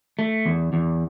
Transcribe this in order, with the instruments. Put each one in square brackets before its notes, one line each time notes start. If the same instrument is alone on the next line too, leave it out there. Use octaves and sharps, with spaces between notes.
[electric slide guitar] A3
E2
E2